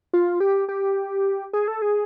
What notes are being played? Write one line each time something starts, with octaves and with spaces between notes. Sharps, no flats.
F4
G4
G4
G#4
A4
G#4